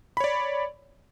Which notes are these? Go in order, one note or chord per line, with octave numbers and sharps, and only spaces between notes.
C#5 D5 B5